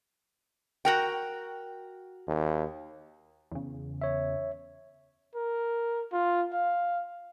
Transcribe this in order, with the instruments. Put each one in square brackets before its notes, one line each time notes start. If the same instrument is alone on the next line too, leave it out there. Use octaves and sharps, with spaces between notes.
[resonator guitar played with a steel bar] F#4 A#4 G5
[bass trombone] D#2
[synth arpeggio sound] E2 C#3
[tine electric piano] C#5 E5
[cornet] A#4
F4
F5